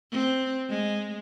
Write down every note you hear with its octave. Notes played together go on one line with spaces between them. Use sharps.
C4
G#3